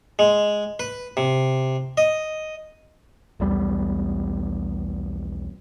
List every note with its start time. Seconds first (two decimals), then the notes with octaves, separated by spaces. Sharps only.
0.19 G#3
0.80 B4
1.17 C3
1.97 D#5
3.40 B1 E2 G3